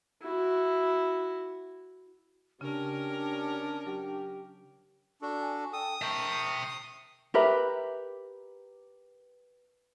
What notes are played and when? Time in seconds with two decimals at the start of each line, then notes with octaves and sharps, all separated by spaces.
0.22 E4 F#4
2.61 C#3 C#4 D4 G4 A#4
3.86 F#3 G4
5.22 D4 F#4 A4
5.42 G#5
5.73 A4 G5 D#6 E6
6.02 A#4 E5 G5 A5 C#6
7.34 G4 A#4 B4 E5